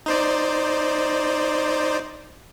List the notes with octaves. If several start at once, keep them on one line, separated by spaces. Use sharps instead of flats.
D#4 C5 D5